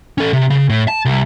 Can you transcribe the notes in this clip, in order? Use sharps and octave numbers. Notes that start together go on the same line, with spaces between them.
C#4 A4
C3
C#3
A2
A5
C2